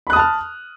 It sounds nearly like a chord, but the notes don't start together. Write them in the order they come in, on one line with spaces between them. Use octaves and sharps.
B5 F#6 D#6 A5 F6